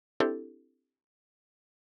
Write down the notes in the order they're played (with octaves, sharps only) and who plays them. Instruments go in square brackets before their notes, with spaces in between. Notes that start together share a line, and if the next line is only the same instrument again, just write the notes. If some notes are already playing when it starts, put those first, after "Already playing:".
[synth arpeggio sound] C4 D4 E4 G4 A4